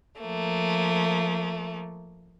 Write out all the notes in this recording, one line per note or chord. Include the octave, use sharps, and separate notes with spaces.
F3 A3 A#3